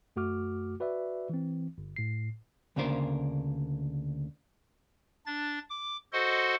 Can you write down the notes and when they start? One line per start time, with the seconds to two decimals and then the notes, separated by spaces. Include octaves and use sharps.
0.16 F#2 A3 F#4 D6 F6
0.80 F#4 B4 D5 E5
1.30 E3 C4
1.78 G1
1.96 A2 C7
2.76 D2 C#3 A#3 D4 A#4 C5
5.26 D4 A6
5.70 D6
6.13 F#4 A4 C5 D#5 F#5 C6